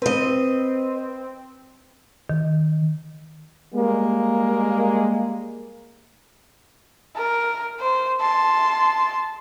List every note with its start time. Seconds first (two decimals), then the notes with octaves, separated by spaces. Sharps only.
0.02 C4 B4 D#5
2.30 D#3
3.74 G3 G#3 A#3
7.16 A#4
7.80 C5
8.21 A5 C6